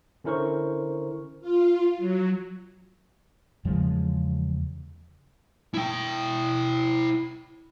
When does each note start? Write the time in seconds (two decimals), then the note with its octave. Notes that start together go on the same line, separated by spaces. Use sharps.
0.24 D3 C#4 E4 A#4 C5 C#6
1.41 F4
1.98 F#3
3.65 E2 C#3 F3 G#3
5.74 E4 G5